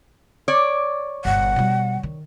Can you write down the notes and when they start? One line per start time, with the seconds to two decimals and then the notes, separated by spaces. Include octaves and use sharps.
0.48 C#5 D5
1.25 G1 A#2 F#5
1.56 B2 G3
2.03 D#3